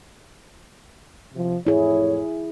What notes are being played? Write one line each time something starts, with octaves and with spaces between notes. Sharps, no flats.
C3 F3
F2 A2 E4 G#4 C#5